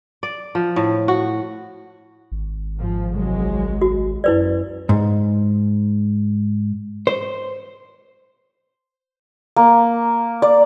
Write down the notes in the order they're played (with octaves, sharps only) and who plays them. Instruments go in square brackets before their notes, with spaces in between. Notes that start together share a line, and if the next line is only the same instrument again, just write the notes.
[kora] D5
F3
A2
F#4
[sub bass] G#1
[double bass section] G#2 F3
C2 F#3 G#3
[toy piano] F#4
[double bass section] F#2 [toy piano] E4 B4 D5
[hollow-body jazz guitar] G#2
C5
[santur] A#3
D5